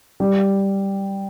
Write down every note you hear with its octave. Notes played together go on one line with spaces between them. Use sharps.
G3